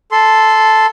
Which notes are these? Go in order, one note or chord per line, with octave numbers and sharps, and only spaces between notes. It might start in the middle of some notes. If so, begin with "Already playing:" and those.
A4 C6